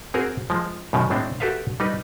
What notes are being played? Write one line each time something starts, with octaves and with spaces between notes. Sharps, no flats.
C4 F#4 G#4 A#4
F3 G#3
F#2 B2 D#3
A2 G#3 C4 D4
F#4 G4 A4 B4 E5 F5
G3 D#4 B4